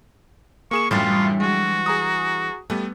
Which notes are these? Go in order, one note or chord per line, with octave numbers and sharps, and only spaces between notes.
A#3 G#4 C#6 E7
F#2 A2 E3 G3 D4 F4
F#3 G#3 F#4
G#4 A#5 D#6
G3 A3 B3